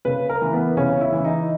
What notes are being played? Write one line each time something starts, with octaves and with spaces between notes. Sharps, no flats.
C#3 B4
A#4
E3
B3
C#3 C#4
E4
E3
D#4